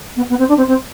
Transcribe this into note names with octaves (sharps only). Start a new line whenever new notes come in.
B3
B3
C4
D4
C4
C4